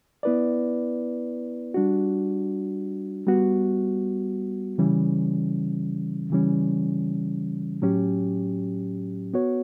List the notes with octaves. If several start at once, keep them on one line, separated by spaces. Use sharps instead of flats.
B3 E4 B4 D5
G3 D4 F#4
G3 B3 F#4
C#3 E3 G3 C#4
C#3 E3 G3 C#4
A2 F#3 C#4 G4
B3 F#4 C#5